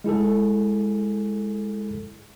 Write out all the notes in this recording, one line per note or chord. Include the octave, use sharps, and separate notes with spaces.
G#3 E4 G#4 A4